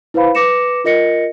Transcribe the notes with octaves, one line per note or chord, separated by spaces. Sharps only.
E4 B4 C5 F5 B5
B4 D6 A#6 C#7 E7
F4 A#4 D#5 A#6 C#7